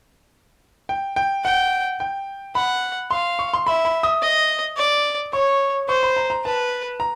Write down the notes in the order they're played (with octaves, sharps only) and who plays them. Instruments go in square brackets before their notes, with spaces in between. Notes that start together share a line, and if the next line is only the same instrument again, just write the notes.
[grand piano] G5
G5
[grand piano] F#5 [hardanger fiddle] G5
[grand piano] G5
[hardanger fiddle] F#5 [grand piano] B5
[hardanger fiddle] F5 [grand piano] C6
[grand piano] C#6
C6
[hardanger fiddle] E5 [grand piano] B5
[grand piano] B5
D#6
[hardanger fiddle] D#5
D5
[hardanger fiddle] C#5 [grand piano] C#6
[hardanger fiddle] C5 [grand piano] C#6
[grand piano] B5
A#5
A#5
[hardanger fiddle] B4 [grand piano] A5
[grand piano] A#5